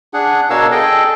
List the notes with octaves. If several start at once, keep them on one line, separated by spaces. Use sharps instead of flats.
D4 G#4 F#5
B2 D4 A#4 C#5 F5 E6
G#4 A4 D#5 G5